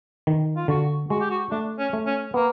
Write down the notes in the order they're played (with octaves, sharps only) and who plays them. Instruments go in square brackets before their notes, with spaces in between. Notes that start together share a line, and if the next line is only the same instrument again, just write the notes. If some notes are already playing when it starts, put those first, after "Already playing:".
[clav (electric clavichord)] D#3
[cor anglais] F4
[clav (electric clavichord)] D3 [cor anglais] F#4
[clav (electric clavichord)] G#3 [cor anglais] F#4
[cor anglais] G4
F#4
[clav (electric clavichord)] A3 [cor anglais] D4
[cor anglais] C#4
[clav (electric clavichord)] A3
[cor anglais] C#4
[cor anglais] A#3 [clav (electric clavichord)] B3